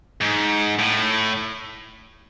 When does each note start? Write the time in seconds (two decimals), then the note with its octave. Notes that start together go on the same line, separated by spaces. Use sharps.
0.21 G#2
0.79 A2